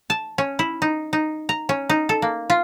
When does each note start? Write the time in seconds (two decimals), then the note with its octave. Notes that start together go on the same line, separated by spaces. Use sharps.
0.10 A5
0.38 C#4
0.59 E4
0.82 D#4
1.13 D#4
1.49 A#5
1.69 C#4
1.89 D#4
2.09 A4
2.22 A#3
2.50 F4